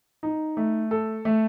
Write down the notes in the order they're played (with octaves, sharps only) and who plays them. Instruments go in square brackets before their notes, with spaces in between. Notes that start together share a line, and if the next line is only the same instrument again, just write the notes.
[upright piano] D#4
A3
A4
A3